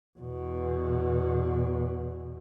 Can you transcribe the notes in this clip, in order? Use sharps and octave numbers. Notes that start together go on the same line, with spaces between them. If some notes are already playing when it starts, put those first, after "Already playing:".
E2 B2